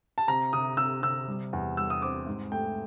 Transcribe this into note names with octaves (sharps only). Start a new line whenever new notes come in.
A5
C3 A#5
C3 D#6
C3 E6
C3 E6
G3
E2
G3 E6
D#6
C4 D6
G#2
A3 G5